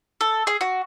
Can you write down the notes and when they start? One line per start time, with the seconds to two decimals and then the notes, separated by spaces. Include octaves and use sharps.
0.21 A4
0.47 G#4
0.61 F#4